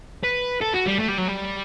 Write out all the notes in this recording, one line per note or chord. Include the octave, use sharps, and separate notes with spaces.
B4
A4
F#4
G3
A3
G3
F#3
G3